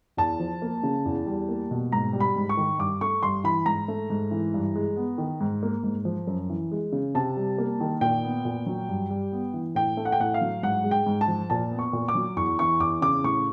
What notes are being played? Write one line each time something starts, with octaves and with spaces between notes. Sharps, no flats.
E2 A5
F3
A#3
C#3
E2
G3
A#3
B2
G#2 A#5
G3
B5
G#2
C#6
D#3
G2 D6
A3 C#6
G2 C6
E3 B5
G#2 A#5
A3
G#2
E3
G2
G#3
B3
D#3
G#2
A#3
G#2
F3
F#2
E3
G#3
C#3
C3 A5
G3
A#3
D#3
A#2 G5
B3
A#2
F#3
G2
G3
B3
E3
A2 G5
A3
F#5
G5
A2 F#5
F5
F#3
G#2 F#5
G#3
G5
G#2
A5
F3
A#2 A5
B3
C#6
A#2
D6
F#3
E2 C#6
E3 C#6
E2 D6
C#3 D6
A2 C#6